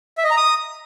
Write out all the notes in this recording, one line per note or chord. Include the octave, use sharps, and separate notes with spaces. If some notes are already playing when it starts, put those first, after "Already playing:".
E5
D#5
A#5
D#6